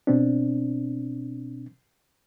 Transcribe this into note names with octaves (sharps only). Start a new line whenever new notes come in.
B2 C4 D4